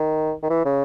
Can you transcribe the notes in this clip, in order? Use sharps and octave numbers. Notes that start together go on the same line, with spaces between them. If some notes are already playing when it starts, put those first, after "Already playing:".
Already playing: D#3
D#3
E3
C#3